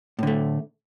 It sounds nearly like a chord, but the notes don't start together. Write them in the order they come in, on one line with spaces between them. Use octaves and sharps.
A2 D3 A3